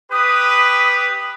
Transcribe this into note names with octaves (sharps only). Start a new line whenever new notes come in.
G4 B4 D#6